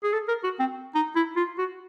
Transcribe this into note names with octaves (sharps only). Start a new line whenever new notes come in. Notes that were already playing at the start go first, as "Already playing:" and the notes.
G#4
A4
A#4
F#4
C4
D#4
E4
F4
F#4